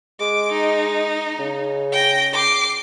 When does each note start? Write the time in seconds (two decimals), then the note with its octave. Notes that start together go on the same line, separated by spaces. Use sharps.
0.20 G#3 D6
0.52 D#4
1.39 C#3
1.92 G5 A#6
2.33 D6 C7